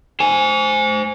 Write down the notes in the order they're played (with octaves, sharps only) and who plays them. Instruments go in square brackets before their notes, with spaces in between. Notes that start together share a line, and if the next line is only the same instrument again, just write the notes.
[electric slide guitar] C5 G#5